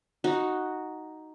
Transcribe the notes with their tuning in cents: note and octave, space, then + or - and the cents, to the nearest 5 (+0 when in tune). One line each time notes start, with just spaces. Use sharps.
D#4 +0 F#4 +0